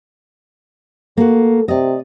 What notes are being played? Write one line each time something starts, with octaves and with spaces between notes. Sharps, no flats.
A#3 F#4 A4
C3 D5 D#5